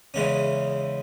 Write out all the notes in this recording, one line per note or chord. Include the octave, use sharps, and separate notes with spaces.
E2 C#3 E3 G#3 C#4